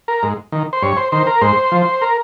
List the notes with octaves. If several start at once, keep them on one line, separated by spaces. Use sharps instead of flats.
A#4
G#2
D#3
C5
G2 C#5
C5
D#3 C5
A#4
G#2 C5
F3
A#4